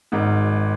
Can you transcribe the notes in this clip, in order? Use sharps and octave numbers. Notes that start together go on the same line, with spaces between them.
G#1 G#2